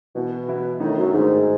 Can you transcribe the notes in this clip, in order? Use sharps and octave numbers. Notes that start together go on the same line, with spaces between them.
B2 E3 B3 E4
E3 B3 E4
A2 D#3 A3 D#4
F#2
G#2 D#3 A3 D#4